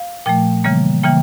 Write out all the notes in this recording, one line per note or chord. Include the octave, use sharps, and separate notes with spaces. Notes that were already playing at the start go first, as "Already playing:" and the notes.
Already playing: F5
A#2 F3 A3 G5
C#3 E3 G3 A#3
C#3 E3 G3 A#3 G5